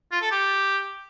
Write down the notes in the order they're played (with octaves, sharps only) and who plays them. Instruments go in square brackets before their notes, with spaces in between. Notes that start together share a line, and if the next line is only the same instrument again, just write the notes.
[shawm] F4
A4
G4